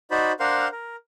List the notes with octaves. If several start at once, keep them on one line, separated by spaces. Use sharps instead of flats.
D#4 F#4 C5 D5 B5
D4 A#4 C5 F5 F#5 C6
A#4